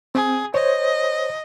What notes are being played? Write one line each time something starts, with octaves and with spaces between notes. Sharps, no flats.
C4 G#4
C5 C#5 D#5